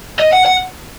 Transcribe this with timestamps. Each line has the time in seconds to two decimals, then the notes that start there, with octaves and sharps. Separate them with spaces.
0.19 D#5
0.32 F#5
0.46 F#5